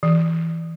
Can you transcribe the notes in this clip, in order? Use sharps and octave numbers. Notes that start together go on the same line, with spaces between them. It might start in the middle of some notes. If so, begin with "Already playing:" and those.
E3